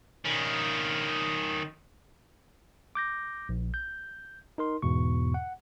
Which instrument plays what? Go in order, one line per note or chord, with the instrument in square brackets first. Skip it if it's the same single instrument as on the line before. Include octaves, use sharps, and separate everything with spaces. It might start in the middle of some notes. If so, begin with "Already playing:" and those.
[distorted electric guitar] D#3 C#4
[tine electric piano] D6 G6 A#6
A#1
G6
D#4 A#4 C6
E2 G#2 B2 C#6
F#5